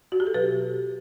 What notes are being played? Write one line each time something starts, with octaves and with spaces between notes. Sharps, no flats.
F#4
G4
A4
B2 F#3 G4 B4